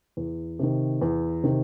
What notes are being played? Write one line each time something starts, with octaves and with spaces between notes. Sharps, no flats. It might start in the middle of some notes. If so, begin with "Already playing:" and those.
E2
C3 D#3
E2
C3 D#3